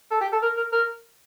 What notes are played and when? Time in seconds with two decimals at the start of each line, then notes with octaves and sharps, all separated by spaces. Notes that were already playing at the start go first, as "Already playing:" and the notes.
0.11 A4
0.21 G4
0.32 A4
0.42 A#4
0.57 A#4
0.72 A#4